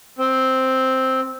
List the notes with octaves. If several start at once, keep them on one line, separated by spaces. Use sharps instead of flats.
C4